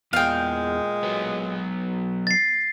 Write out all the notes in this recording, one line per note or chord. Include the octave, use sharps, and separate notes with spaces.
E2 A#2 G#3 F5 G5
F#3 B3
A6 C7